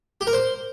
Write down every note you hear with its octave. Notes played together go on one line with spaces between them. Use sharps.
G4
A#4
C5